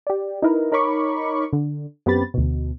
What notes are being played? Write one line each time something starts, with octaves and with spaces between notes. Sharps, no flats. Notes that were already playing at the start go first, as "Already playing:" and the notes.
G4 D5
D#4 E4 A#4 B4
D#4 A#4 C#5 B5 C#6 D6
D3
F#2 B3 C4 G4 B5 A6
D2 B2